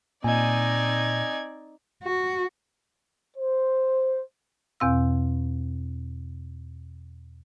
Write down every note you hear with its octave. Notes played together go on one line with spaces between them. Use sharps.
A#2 C4 D#4 D5 D#5 G#5 G#6
F#4
C5
E2 B2 C4 F5 E6